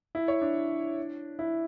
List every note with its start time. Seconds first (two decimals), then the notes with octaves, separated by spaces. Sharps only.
0.15 E4
0.28 C#5
0.42 D4
1.39 E4